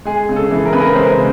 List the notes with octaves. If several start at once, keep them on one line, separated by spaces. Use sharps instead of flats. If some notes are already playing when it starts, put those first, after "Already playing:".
G#3 G#4
C#3
A4
E3
A#4
C#3 B4
A#4
G#3 C5
C#3